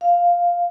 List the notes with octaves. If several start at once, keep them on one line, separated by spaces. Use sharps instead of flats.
F5